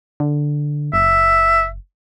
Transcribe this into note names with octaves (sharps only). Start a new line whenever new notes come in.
D3
F#1 E5